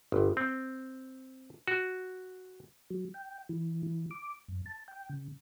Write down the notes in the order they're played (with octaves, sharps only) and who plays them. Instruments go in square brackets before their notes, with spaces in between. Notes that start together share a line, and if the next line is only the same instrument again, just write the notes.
[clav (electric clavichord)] G1
C4
F#4
[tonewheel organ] F#3
G5
E3
E3
D6
F#2
A5
G5
C#3